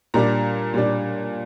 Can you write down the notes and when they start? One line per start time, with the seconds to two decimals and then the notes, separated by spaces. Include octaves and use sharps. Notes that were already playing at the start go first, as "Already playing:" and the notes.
0.14 A#2 G3 D4 A#5
0.74 A#2 G3 D4